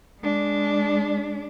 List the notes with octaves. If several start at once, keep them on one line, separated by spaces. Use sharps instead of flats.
G#3 D4